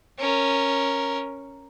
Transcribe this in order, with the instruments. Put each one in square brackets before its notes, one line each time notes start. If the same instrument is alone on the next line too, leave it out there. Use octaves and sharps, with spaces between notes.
[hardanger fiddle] C#4 A#4